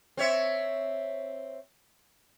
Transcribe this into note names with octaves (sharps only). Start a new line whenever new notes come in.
C4 C#5 E5